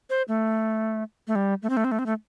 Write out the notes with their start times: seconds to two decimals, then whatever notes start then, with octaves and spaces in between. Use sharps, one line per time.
0.10 C5
0.28 A3
1.28 A3
1.35 G3
1.63 A3
1.70 C4
1.77 A3
1.84 C4
1.92 A3
1.99 C4
2.06 A3